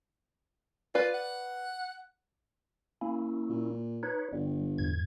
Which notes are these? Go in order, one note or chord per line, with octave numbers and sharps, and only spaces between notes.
F4 B4 D5
F#5
A#3 C#4 E4
A#2
D#4 B4 C#5
G1 G3
E2 G#2 G#6